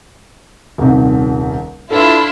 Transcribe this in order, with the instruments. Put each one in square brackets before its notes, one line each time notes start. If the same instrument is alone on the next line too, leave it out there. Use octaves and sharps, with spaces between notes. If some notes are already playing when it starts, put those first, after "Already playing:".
[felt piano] D#1 C2 D#4
[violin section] D4 E4 F4 [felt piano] A4 B4